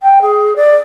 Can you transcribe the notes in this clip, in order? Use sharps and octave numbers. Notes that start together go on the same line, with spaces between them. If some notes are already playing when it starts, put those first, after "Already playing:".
G5
G#4
D5